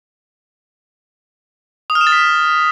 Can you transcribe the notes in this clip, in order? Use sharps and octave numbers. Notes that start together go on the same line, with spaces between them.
D#6
F6
E7
A6
B6